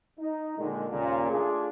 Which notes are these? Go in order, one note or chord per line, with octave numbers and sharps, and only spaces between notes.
D#4
A#2 D3 D#3 G#3
D#2 A#2 C#3
A3 D4 F4 G#4